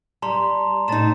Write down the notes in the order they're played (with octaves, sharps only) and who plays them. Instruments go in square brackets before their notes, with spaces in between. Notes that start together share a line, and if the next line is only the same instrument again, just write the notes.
[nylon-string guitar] G3 [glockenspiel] A5 A#5 C6
[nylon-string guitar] A2 D#4 [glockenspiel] A5 A6 E7